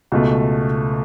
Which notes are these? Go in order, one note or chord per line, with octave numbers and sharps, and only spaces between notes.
C#2 B2 A3